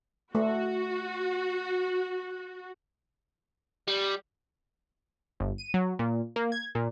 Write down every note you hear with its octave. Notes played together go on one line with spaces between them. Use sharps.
A3 F#4
G3
G1
D#7
F#3
A#2
A#3
G#6
A#2